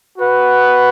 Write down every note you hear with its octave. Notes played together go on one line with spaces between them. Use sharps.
F#4 B4 F#5